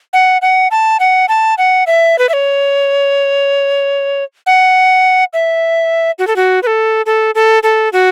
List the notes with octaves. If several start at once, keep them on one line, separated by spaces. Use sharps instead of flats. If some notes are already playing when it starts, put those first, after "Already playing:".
F#5
F#5
A5
F#5
A5
F#5
E5
B4
E5
C#5
F#5
E5
F#4
A4
F#4
B4
A4
A4
A4
A4
F#4